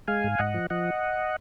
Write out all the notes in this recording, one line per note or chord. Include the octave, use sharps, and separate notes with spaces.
G#3 F5 G#5
G#2
G#2 D#5 F#5
F3
F3 D#5 F#5